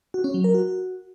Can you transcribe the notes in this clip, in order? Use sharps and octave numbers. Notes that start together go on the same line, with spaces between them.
F#4
C#4
F#3
A#4
F#4